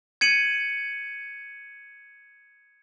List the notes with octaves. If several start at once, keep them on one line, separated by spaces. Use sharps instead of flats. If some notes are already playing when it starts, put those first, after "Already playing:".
G#6 C#7 D#7 F#7